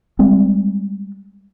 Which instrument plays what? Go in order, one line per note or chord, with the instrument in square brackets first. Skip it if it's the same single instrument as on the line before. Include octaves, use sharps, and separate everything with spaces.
[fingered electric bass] G3 G#3 C4